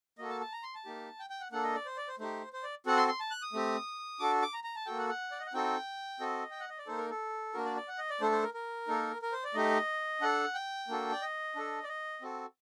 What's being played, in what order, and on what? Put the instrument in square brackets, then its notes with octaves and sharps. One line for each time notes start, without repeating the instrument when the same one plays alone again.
[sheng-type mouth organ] A#3 F#4 A4 D#5
A5
A5
A#5
C6
A5
A#3 D#4 G4
G5
G5
F#5
A#3 D4 A4 F#5
D#5
D5
C5
D5
C5
A3 D#4 G4 C5
C5
D5
C4 F#4 A4 F#5
C6
C6
A5
F#6
D#6
A3 C4 G4
D4 F#4 A4 D6
D6
A#5
A#5
A5
A#3 F#4 A4 G5
F#5
F#5
D5
D#5
F#5
C4 D#4 F#4 A4 G5
C4 F#4 A4 D#5
G5
F#5
D#5
D5
A#3 D#4 A4 C5
A#4
A4
A#3 D4 F#4 A#4
D5
D5
F#5
D#5
D5
A3 D4 A4 C5
C5
A#4
A#4
A#3 D#4 A4
A#4
C5
D5
A3 D#4 G4 D#5
D4 A4 F#5
G5
A#3 D4 F#4 A4
D5
D#5
D4 A4
D5
D#5
C4 F#4 A4